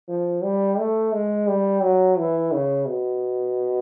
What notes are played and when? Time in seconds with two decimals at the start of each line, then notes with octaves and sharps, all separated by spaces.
0.09 F3
0.43 G3
0.79 A3
1.13 G#3
1.49 G3
1.82 F#3
2.18 E3
2.53 C#3
2.87 B2